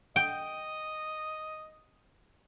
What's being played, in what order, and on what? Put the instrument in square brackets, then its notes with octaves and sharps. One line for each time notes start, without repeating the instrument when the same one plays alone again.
[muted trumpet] D#5 [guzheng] G5